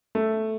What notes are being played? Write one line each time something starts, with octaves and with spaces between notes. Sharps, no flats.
A3